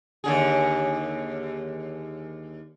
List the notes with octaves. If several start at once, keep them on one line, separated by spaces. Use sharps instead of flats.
D#2 D3 G#4